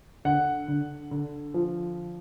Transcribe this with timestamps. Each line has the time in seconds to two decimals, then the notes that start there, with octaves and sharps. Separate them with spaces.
0.25 D3 F#5
0.68 D3
1.11 D3
1.54 F3